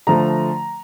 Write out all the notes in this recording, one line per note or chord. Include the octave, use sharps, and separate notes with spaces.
D3 F3 A3 A#5